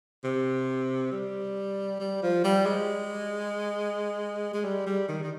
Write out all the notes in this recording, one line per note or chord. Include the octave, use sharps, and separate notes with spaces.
C3
G3
G3
F3
G3
G#3
G#3
G3
G3
D#3
D#3